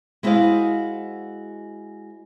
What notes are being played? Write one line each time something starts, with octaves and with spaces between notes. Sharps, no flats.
G#3 E4 F#4 C5 D#5 F5